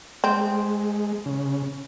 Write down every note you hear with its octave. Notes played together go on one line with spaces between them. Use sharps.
G#3 C4
C#3